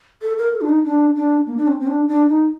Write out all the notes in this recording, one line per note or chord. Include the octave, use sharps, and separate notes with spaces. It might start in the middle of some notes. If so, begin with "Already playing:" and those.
A4
A#4
A4
D4
D#4
D4
D4
A#3
D4
C4
C4
D4
D4
D#4